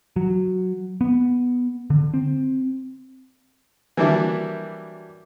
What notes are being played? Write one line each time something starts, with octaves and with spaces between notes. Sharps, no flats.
F#3
B3
D3
C4
E3 F#3 G3 A#3 D4 E4